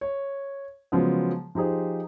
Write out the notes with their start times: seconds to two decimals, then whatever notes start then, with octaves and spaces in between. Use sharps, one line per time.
0.01 C#5
0.92 C#3 F3 F#3 G#3 B3
1.55 F3 D#4 G4 G#4 C5